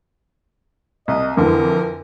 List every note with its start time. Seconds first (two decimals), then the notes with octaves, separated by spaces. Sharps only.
1.08 C2 D#5
1.37 F2 D3 E3 A#4